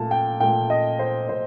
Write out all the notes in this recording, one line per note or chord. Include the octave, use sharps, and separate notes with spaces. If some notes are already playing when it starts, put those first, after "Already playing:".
Already playing: A#2 A3 A5
G5
A#2 A3 G5
D#5
C5
A#2 C5